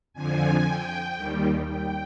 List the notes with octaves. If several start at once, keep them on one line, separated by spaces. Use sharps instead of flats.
F2 D3 F3 G#5
G5
D#2 D#3 G3
G5